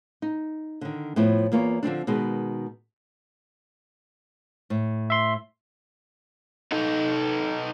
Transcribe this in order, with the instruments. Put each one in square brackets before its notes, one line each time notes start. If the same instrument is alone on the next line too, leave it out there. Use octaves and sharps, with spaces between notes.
[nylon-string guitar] D#4
D3 D#3
A2 F3 B3 E4
E2 A#3 F4 C#5
D3 F3 C4 D4
B2 D#3 G#3 B3
A2
[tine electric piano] E5 C6
[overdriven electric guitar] D#4 A4